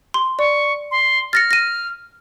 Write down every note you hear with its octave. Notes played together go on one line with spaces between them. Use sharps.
C6
D5 C#6
C6
F6 A6 A#6 C#7
A#6 D#7